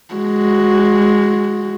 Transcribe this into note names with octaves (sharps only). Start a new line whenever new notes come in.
G#3 F#4